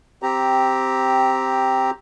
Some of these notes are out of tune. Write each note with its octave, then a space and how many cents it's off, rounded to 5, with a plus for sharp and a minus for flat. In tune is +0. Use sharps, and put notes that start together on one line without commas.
C4 +0 G4 +0 A#5 +0